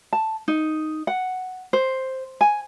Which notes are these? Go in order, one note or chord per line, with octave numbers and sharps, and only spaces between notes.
A5
D#4
F#5
C5
G#5